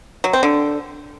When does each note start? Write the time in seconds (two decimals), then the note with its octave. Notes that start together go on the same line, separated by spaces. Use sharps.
0.24 F#3
0.33 C4
0.43 D3